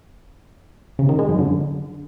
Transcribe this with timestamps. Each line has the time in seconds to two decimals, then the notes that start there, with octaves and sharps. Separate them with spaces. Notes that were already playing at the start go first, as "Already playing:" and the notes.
0.99 C#3
1.09 D#3
1.19 G#3
1.29 F#2
1.39 D3